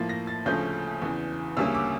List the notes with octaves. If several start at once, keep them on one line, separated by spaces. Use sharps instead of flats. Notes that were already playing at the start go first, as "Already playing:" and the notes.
Already playing: A2 F3 A#3 A6
A#6
A6
D2 C#3 F3 A3 C#4 G6
E2 C#3 E3
D2 C#3 G3 A#3 C#4 E6
D6